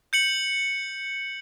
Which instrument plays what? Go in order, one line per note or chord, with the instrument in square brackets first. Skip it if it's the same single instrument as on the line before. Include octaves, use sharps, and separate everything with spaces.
[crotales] G6 C#7 F#7